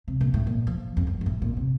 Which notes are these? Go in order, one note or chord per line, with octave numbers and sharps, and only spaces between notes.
C3
A#2
A2
A#2
F3
F2
F#2
F#2
A2
A#2
C3